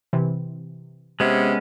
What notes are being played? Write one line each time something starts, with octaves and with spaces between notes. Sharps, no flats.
C3 E3
C3 G#3 B3 C#4